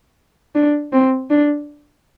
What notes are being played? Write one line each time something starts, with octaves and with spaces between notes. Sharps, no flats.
D4
C4
D4